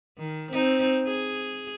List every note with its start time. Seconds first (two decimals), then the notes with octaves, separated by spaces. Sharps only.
0.19 D#3
0.52 C4 D#4
1.07 G#4